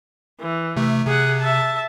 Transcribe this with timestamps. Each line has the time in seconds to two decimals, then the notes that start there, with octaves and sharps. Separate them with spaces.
0.41 E3
0.76 C3 A3
1.07 C3 G#4 F#5
1.40 E5 A5